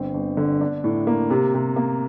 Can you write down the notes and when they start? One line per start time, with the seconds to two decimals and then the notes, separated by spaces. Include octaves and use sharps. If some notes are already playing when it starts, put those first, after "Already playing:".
Already playing: G1 C4
0.14 G1
0.37 D3
0.61 D4
0.84 A2
1.07 A#3
1.30 C3
1.54 C3
1.76 A#3